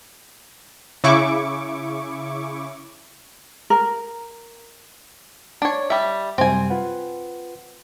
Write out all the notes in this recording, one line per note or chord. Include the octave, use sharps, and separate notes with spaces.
C#3 E4 C#6 D6
A#4
D4 C#5
G3 E5
F#2 C3 G3 C4 G#5
F4 B4 F#5